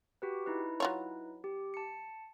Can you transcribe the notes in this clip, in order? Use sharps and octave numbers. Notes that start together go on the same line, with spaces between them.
F#4 G4 B4
D#4 E4 B4
F#3 F4 C#5
G4
A5 C#7